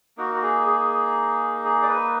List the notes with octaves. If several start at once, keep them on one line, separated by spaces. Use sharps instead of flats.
A#3 D#4 F#4 A#4
F#4
G#4
G#4
G#4
D5
B4